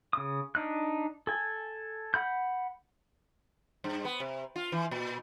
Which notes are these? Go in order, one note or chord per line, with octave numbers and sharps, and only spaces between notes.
C#3 D#6
D4 D#4 F#6
A4 G#5
F#5 B5 G6
G2
B3
C3
F4
E3
A#2